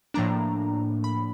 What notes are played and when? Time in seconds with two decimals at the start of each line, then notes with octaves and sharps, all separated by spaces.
0.14 A2 F3 A#3 D4 A#5
1.04 B5